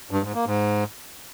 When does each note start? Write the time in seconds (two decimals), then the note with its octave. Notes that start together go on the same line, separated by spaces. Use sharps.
0.11 G2
0.23 G#2
0.35 A#3
0.46 G#2